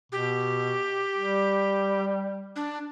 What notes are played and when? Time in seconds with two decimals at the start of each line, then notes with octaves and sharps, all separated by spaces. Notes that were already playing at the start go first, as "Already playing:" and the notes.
0.12 B2 G4
1.17 G3
2.56 D4